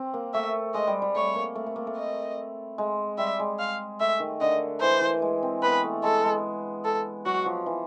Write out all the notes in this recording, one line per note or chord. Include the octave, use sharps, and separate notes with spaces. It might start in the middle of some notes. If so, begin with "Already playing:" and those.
Already playing: C4
A#3
A3 E5
G#3 D#5
G3
G3
A3 C#5
A#3
A3
A3
A#3
A3
D#5
G#3
G3 E5
G#3
F5
A3 E5
D#3
D3 D#5
E3 C5
E3
G#3
C4
B3 B4
A3
G#3 A4
G#3
A4
F#3 F#4
F3
E3